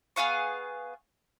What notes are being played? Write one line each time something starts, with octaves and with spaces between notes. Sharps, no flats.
B3 G#4 F5 C#6